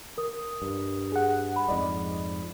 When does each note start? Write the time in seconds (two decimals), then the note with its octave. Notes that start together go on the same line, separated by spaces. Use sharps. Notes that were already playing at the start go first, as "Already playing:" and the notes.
0.18 A#4 D#6
0.62 G2
1.12 G#4 F#5
1.56 B5
1.68 F2 G#2 D5 D#5